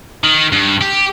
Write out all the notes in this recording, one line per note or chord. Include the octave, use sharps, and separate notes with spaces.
D#3
G2
G4